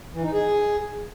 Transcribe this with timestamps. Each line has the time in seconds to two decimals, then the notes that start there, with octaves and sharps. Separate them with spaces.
0.13 E3
0.23 D#4
0.33 G#4